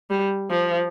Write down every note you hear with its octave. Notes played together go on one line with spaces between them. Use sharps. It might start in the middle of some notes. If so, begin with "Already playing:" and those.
G3
F3